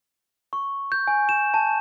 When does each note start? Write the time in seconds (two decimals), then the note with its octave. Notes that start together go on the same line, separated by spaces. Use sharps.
0.53 C#6
0.92 G6
1.07 G#5
1.29 E7
1.54 A5